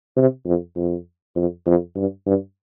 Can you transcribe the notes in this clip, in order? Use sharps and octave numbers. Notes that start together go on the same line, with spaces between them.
C3
F2
F2
F2
F2
G2
G2